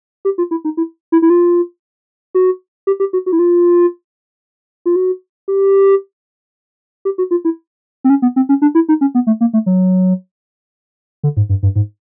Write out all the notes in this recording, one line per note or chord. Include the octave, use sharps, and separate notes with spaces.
G4
F4
E4
D#4
E4
E4
E4
F4
F#4
G4
G4
F#4
F#4
E4
F4
F4
F#4
G4
G4
F#4
F4
E4
C4
C#4
B3
C4
C#4
D4
E4
D#4
C#4
B3
A3
A#3
A3
F#3
D3
G#2
G2
G2
G#2